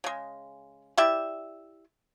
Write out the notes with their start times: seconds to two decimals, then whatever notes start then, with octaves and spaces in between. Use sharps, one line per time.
0.04 C#3 G#3
0.97 E4 G4 D5 E5